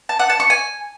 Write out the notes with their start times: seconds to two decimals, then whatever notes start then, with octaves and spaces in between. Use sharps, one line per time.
0.09 A5
0.19 F#5
0.30 A5
0.40 C#6
0.50 G#5